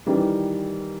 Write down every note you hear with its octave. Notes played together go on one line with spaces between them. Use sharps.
D#3 E3 G3